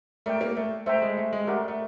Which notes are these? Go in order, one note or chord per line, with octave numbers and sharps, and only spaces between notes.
A3 A#4 D5 G5
A#3
A3
A3 C5 E5 G5 A#5
G#3
A3
G#3
A3 G4 A#4 D5 F#5
A3